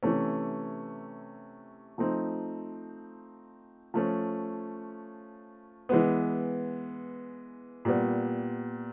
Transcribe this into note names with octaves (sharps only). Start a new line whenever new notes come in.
C3 E3 A3 C#4
F3 A3 C4 D#4
F3 A3 C#4
E3 G#3 B3
A#2 G3 B3